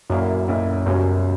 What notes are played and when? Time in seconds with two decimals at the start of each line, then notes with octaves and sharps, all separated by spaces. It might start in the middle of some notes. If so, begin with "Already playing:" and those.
0.10 B1 F#2 A#2 A#3 E4
0.48 B1 A#2 A#3 E4
0.86 C#2 F#2 B2 G3 C#4